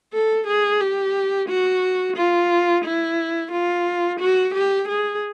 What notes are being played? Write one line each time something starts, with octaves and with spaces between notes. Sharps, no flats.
A4
G#4
G4
F#4
F4
E4
F4
F#4
G4
G#4